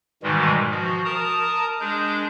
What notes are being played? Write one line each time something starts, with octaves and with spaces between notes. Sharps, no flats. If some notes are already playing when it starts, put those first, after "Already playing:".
G#2 B2 D#3 E3 G3 G#3
F3 F#4
A#4 A5 A#5 D#6
G#3 D4 G#4 G6